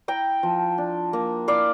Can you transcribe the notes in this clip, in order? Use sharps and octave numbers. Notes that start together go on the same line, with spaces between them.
E4 G5 A#5
F3
D4
A#3
E4 D5 F5